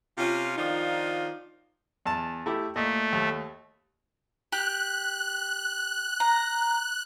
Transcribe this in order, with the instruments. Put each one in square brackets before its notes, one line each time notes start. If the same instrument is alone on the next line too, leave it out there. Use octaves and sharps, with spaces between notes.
[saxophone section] C3 C#4 F4
D#3 F3 D4 D#4 F4
[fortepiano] E2 A5
A3 E4 G4
[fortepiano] A#2 D#5 [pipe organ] A3
[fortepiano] D#2
[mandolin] G4 [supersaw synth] F#6
[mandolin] A#5